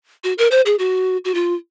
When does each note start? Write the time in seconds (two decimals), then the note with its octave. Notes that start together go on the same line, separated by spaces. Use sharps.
0.24 F#4
0.38 A#4
0.51 C5
0.66 G#4
0.79 F#4
1.25 F#4
1.34 F4